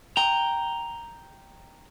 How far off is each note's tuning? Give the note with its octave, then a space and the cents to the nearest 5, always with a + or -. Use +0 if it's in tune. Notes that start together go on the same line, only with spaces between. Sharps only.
G5 +0 A#5 +0